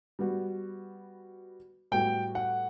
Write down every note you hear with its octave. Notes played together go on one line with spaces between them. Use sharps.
G3 B3 F#4
A2 G3 B3 F#4 G5
F#5